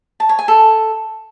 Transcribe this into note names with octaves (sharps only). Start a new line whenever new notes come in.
A5
C#5
G#5
A4